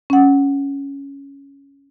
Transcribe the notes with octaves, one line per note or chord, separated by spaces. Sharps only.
C#4 F#5